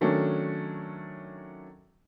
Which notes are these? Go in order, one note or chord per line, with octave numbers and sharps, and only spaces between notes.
D#3 F#3 A3 C#4 D4